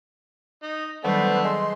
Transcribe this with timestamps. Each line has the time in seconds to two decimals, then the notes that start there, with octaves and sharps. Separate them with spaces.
0.63 D#4
1.04 D#3 F#3 G3 A3 B3 D4 B4 C5
1.44 G#3 C6